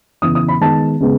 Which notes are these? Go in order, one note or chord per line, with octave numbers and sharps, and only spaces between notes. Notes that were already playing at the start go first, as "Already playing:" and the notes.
C#3 E3 B3 D#6
D#6
B5
D#3 G#3 B3 A5
C#3 G#3 B3